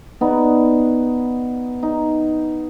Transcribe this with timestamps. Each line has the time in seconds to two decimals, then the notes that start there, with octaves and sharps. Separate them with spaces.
0.21 B3 D#4 D5
1.83 D#4